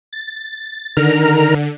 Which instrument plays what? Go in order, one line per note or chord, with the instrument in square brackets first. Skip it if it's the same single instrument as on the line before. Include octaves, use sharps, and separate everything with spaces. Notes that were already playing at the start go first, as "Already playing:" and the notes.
[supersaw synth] A6
[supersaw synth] D3 [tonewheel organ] D#3 A#4 A#5